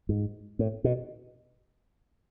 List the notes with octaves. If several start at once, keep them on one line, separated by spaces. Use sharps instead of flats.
G#2
A2
B2